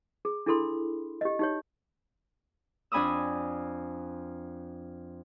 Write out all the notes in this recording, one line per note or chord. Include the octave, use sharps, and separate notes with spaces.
G#4
D4 E4 G#4 A4 B5 C6
G4 D#5
D#4 G4 C#5
F2 D4 G#5 B5 D#6 E6